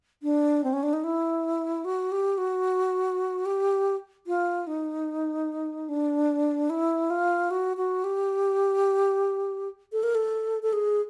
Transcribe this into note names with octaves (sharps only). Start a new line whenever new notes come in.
D4
C4
C#4
D4
D#4
E4
F#4
G4
F#4
G4
F4
D#4
D4
E4
F4
F#4
F#4
G4
A4
A#4
A4
A4
G#4